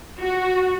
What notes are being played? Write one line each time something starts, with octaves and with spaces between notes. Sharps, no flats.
F#4